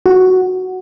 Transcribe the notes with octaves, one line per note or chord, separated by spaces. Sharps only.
F#4